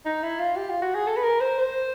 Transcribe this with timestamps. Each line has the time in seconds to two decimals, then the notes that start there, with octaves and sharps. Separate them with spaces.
0.06 D#4
0.23 E4
0.39 F4
0.56 G4
0.70 F4
0.82 F#4
0.95 G#4
1.07 A4
1.17 B4
1.23 A#4
1.41 C5
1.58 C5